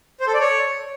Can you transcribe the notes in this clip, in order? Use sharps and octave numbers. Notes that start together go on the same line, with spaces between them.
C5
A4
D5
C#5